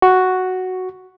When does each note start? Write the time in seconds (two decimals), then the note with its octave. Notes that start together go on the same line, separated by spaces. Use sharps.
0.02 F#4